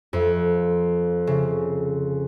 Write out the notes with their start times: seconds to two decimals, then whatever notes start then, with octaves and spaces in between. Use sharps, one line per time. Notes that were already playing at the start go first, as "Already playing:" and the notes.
0.13 F2
1.27 C#3